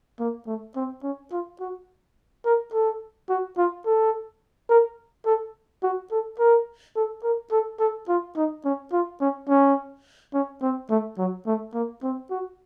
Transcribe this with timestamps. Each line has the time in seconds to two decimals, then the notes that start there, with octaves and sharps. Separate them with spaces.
0.20 A#3
0.47 A3
0.76 C4
1.03 C#4
1.32 F4
1.60 F#4
2.45 A#4
2.73 A4
3.29 F#4
3.58 F4
3.86 A4
4.70 A#4
5.26 A4
5.83 F#4
6.12 A4
6.39 A#4
6.96 A4
7.23 A#4
7.52 A4
7.80 A4
8.09 F4
8.36 D#4
8.65 C#4
8.93 F4
9.21 C#4
9.49 C#4
10.34 C#4
10.62 C4
10.90 A3
11.18 F#3
11.46 A3
11.74 A#3
12.03 C4
12.30 F#4